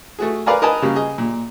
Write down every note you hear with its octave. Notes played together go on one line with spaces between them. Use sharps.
A3 F#4 G#4
A#4 B4 D5 F5 G#5 A#5
A#4 B4 D#5 G#5 A5 B5
C#3 G3 A#3
G#4 D#5
A#2